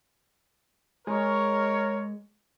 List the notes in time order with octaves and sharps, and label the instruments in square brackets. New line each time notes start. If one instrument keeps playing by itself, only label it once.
[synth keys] G#3 [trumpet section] A#4 C#5